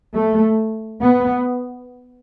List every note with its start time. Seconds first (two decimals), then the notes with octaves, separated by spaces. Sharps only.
0.14 A3
1.02 B3